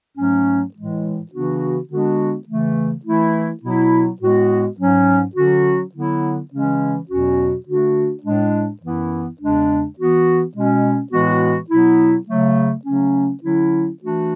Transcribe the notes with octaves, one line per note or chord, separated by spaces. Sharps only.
G#2 F#3 A3 C#4
A2 E3 G#3
C#3 E3 B3 D4 F#4
D3 G#3 B3 D4 F#4
C#3 E3 A3
E3 A3 E4
B2 F#3 B3 E4
A2 G#3 B3 F#4
G#2 F#3 C#4
D3 F#3 C#4 F#4
D3 F#3 B3 E4
C#3 E3 G#3 C#4
E2 B2 F#3 C#4 F#4
D3 A3 D4 F#4
A2 G#3 D4
F#2 E3 B3 E4
E2 C#3 G#3 D4
E3 B3 F#4
B2 G#3 C#4
A2 E3 G#3 B3 F#4
B2 F#3 B3 E4
C#3 F#3 A3
C#3 F#3 A3 C#4
D3 F#3 C#4 E4
E3 A3 D4 F#4